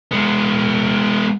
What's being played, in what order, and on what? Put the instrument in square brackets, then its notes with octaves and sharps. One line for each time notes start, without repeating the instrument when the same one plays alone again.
[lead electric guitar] G#3 B3